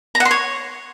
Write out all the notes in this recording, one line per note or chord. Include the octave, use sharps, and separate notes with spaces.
A#5
F#5
C6
C#5